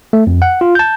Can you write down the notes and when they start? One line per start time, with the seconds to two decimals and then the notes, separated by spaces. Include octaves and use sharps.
0.13 A3
0.27 F2
0.42 F#5
0.61 F4
0.75 A5 G6